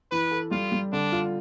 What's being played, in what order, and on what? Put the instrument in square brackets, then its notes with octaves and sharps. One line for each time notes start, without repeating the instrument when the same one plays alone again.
[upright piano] E3 [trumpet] B4
[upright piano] A4
[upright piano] G3 [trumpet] F4
[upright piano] G3
[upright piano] D3 [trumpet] D4
[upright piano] F4